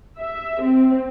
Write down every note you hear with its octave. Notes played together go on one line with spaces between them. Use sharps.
E5
C4